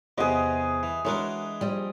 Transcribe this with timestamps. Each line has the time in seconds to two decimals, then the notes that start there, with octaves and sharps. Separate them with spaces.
0.18 E2 C3 B3 G#4 D#5
0.83 E3
1.05 E3 G#3 D4 F#4 A#4 C#5
1.61 A#1 G3 D#5